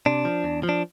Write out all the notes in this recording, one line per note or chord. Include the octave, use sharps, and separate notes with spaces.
C3 D4
F3
E2
F3
D4